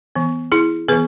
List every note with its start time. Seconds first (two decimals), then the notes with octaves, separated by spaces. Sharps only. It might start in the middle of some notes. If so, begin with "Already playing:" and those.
0.16 E3 B3
0.52 E4 G#4
0.88 E3 B3 G#4 B4